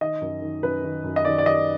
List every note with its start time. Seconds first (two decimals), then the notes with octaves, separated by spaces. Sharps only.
0.01 D#3 D#5
0.22 F#2
0.42 D#3
0.63 F#2 B4
0.84 D#3
1.04 F#2
1.16 D#5
1.25 D#3 D5
1.38 D5
1.45 F#2 D#5